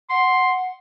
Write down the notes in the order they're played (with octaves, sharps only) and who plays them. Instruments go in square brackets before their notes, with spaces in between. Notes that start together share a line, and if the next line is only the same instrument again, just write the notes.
[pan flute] F#5 [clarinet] C6